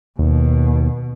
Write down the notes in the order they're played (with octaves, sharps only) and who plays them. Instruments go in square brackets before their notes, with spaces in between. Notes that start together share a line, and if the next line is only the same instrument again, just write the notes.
[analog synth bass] D#2 [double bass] B2